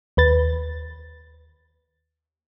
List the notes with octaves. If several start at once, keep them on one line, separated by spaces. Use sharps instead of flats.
D#2 B4 A6